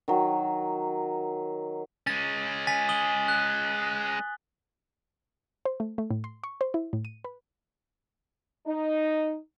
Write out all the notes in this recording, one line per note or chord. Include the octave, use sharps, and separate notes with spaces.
D#3 F#3
G#3 C#4 A6
G#5 A6 B6
D#6 F#7 G7
F#6
C5
A3
A3
A2
C6
C#6
C5
E4
A2
D#7
B4
D#4